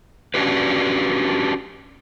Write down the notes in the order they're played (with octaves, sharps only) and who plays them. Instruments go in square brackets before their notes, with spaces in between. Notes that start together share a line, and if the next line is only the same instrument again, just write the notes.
[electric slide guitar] C#4 D4 F#4 G4 B4